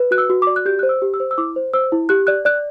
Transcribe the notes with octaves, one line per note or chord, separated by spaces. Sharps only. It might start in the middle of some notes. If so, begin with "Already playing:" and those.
Already playing: B4
F#4 F#6
E6
F#4
D6
D5
F#6
G4 G6
C5 F#6
E6
G4
E6
C5
E6
E4 D6
C5
C5 E6
E4
G4 F#6
D5 F#6
D5 F#6